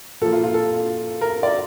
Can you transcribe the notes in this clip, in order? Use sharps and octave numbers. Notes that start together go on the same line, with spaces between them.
A#2 F3 A#3 A4
F4
F4
A4
A#4
D5